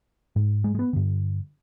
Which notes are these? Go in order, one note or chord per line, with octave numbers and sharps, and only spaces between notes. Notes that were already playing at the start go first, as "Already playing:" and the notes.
G#2
G#3
G#3
B3
G2 D3